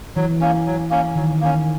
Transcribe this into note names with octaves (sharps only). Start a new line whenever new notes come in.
E3 F#3
A#3 C#4
F#3
A#3 C#4
D#3 F#3
A#3 C#4